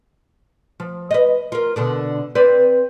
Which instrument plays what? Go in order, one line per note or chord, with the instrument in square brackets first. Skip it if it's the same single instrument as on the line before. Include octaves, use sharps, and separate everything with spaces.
[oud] F3
B4 D#5
F4 A#4
B2 D3 D4
C4 B4 D5